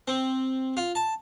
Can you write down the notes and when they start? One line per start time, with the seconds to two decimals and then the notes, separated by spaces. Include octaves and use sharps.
0.08 C4
0.77 F4
0.95 A5